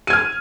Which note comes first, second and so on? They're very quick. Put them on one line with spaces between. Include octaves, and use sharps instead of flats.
D#7 G#6 F6